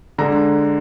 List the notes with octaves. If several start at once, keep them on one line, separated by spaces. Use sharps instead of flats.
D3 G#3 A#5